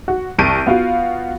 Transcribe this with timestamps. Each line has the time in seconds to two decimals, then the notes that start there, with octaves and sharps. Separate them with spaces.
0.08 F#4
0.39 C2 A5 C#6 G6 D7 D#7
0.67 B3 F4 F#4 F5